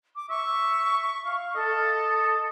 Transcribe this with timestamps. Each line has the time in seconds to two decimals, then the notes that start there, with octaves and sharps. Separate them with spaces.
0.16 D6
0.30 E5 C#6
1.25 F5
1.55 A4 D#5